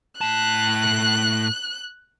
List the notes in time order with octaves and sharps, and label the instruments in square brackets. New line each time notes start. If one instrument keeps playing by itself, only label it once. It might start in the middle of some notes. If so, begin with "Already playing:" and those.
[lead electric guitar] A2 A5 [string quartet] F#6